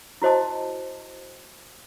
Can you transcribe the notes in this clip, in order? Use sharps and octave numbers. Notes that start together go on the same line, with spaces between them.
E4 F#4 C5 D#5 A5